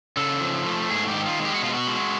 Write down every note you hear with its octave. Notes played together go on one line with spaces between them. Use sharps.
C#3 A4
F3
A3
G#2 G#4
G4
D#3
F4
G#3
G4
F#4
B2 F4
F#4
G#3